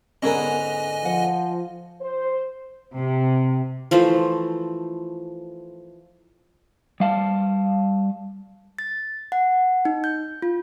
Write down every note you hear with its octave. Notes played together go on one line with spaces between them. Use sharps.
G#2 D3 B3 C#4 G#4 A#4 D#5 G#5
F3 F#5
C5
C3
E3 F3 A3 C5
G3 F5 A5
A6
F#5
D#4
G6
F4